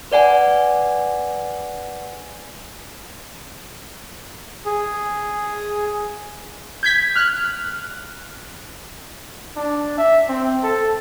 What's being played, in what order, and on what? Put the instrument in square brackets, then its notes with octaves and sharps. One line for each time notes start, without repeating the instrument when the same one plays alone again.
[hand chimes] B4 D5 F#5 G#5
[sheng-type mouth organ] G#4
[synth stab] G6 G#6 B6
F6 F#6
[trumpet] D4
E5
C4
A4